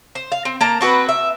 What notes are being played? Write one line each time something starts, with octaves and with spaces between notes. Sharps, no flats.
C5
F5
C4
A#3 A5 A#5
C4 F#4 G#4 B4
E5